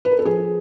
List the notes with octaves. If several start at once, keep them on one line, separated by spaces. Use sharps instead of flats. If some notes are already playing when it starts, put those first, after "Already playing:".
B4
A#4
A4
F3 G#4